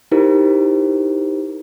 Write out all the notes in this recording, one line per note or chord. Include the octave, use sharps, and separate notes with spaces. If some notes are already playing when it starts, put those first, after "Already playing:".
D#4 E4 G4 A#4 C5